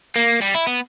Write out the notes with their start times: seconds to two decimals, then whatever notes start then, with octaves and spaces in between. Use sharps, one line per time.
0.16 A#3
0.42 G3
0.55 E4
0.67 B3